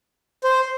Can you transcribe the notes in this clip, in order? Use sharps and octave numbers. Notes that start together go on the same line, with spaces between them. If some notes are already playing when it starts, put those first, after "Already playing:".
C5